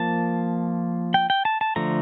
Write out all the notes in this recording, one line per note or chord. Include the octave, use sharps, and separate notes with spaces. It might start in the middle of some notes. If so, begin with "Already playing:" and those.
Already playing: F3 A#3 A5
G5
G5
A5
A5
D3 F3 A3 A#5